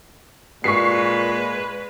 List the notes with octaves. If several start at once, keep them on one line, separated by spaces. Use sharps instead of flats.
A#2 G#3 B4 C#6 B6 C7